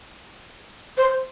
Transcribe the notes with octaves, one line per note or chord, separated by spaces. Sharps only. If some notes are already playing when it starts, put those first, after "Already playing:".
C5